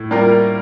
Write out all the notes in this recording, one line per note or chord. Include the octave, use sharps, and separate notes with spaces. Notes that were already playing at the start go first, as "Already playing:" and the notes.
Already playing: A2
G3 A#3 F4 A#4